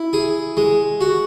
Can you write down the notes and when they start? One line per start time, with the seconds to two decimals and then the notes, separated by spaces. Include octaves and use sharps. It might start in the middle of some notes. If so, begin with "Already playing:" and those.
Already playing: E4
0.13 G#4
0.57 G#3
1.01 F#4